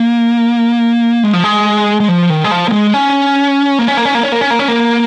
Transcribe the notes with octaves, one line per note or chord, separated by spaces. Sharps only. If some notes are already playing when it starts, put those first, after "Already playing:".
Already playing: A#3
G#3
F3
G#3
G#3
F3
D#3
G#3
F3
A#3
G#3
C#4
A#3
C#4
A#3
C#4
A#3
C#4
A#3
C#4
A#3
C#4
A#3